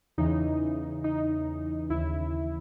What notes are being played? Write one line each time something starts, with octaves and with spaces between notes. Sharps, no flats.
E2 C#3 E3 D#4
D#4
D#2 C#3 E3 E4